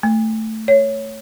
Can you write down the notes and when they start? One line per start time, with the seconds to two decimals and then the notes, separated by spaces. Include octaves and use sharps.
0.03 A3
0.68 C#5